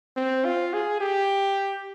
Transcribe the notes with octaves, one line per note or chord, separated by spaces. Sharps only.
C4
F4
G#4
G4